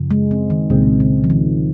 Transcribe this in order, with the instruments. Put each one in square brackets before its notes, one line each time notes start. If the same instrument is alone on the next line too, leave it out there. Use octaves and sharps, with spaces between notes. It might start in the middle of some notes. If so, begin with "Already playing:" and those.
Already playing: [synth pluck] F#2 C#3 F3
[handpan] G#3
C4
D#3
[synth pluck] C2 A#2 G#3 C4 [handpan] C#3
[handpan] C#3
F3
D#3